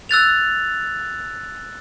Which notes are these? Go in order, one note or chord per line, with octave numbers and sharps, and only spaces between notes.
E6 F#6 A6 F7